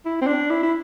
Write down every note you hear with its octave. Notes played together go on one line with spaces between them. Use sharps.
E4
C4
D4
E4
E4